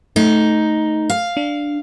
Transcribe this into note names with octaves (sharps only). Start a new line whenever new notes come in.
A3 D#4
F5
D4